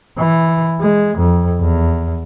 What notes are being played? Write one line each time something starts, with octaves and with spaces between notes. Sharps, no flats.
E3
G#3
F2
E2